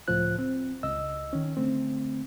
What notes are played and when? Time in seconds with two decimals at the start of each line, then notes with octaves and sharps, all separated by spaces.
0.08 C#2 A2 F3 F4 C5 F#6
0.39 C4
0.83 C#2 D#5 E6
1.33 D#3 C#4
1.57 D3 A3 C4